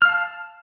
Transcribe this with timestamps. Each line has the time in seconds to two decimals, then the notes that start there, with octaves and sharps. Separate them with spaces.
0.02 F6
0.05 F5
0.09 A5